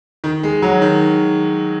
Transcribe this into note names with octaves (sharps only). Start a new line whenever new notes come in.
D#3
G#3
F#3
D#3